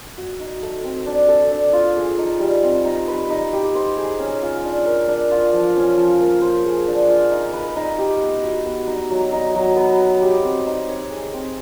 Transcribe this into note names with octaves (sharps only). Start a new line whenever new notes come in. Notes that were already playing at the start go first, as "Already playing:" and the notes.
F#4
D#4
A3
C4
D4
A4
D4
F4
G#4
D#4
G3
C4
D#4
B4
D#4
G4
C5
G#4
C#4
F4
D4
A#4
D4
F4
F3
C#4
F3
A#3
C5
G#4
D4
F4
D#4
B4
D#4
G4
B3
F#4
B3
D#4
F#3
D#4
F#3
B3
B4
G4
C4
D#4
C#5
G#4
C4